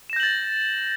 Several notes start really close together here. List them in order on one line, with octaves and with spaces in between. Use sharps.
E7 A#6 G6 F#7 A6